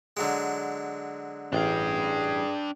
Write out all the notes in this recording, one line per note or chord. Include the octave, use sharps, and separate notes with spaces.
D3 F#3 G#3
A1 D4 G#4 F5 G5